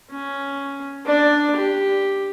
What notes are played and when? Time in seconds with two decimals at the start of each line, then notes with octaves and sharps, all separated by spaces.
0.11 C#4
1.06 D4 D5
1.56 G4